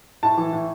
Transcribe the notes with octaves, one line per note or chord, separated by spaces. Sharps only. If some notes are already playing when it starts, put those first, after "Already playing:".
A2 A5
E3
A2